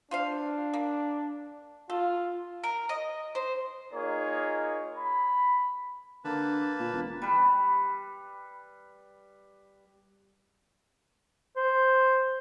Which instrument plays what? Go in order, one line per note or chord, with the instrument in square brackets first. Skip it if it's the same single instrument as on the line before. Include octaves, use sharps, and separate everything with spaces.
[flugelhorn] D4 [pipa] F4 C5 F5
[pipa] A#3
[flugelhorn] F4 [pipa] A4
[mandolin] A#4
D#5
C5
[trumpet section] A#3 D#4 F4 G#4 A#4 C#5
B5
[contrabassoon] D3 [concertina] A#3 B4 A5
[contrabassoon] A#2
E1
[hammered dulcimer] G3 B4
[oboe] C5